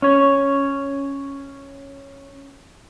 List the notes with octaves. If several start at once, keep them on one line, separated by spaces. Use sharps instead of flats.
C#4 C#5